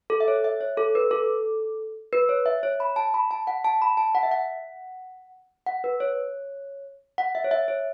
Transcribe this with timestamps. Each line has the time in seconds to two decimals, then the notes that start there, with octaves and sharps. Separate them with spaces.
0.10 A4
0.20 E5
0.28 C#5
0.44 E5
0.61 C#5
0.77 A4
0.95 B4
1.11 A4
2.13 B4
2.29 C#5
2.46 E5
2.63 C#5
2.80 B5
2.96 A5
3.14 B5
3.31 A5
3.47 F#5
3.64 A5
3.82 B5
3.97 A5
4.15 F#5
4.23 E5
4.31 F#5
5.66 F#5
5.84 B4
6.00 C#5
7.18 F#5
7.35 E5
7.44 C#5
7.51 E5
7.68 C#5